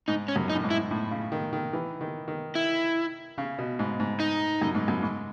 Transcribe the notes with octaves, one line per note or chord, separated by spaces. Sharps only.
G#2 D#4
C#4
F#2
D#4
A2
G#2
E4
A2
C#3
D#3
D#3
E3
D#3
D#3
E4
C#3
B2
G#2
G#2
D#4
F#2
G#2
F#2
G#2